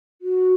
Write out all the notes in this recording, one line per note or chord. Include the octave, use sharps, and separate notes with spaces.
F#4